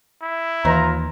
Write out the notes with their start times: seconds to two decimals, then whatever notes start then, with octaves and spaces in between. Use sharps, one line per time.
0.23 E4
0.65 D#2 E3 F4 B4 D#5 A#5